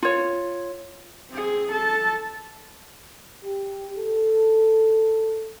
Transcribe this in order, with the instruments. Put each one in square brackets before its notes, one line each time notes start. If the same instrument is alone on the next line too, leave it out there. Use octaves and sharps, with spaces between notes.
[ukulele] F4 C#5
[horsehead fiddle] C4 G#4
A4 A5
[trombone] G4
A4